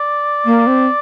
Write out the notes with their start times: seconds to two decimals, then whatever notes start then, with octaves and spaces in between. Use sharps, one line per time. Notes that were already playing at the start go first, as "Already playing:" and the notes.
Already playing: D5
0.45 A#3
0.67 C4